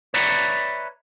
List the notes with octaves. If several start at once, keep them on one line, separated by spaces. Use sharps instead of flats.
B4 C#5 D5 E5 A#5 B5